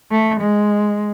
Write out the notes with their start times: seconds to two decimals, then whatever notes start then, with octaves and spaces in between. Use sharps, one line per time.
0.11 A3
0.41 G#3